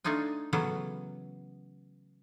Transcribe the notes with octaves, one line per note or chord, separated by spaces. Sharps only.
A3 D4 D#4 F4 G#5
C#3 E3 F#3 A3 B3 C#4